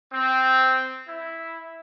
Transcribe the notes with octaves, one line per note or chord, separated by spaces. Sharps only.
C4
E4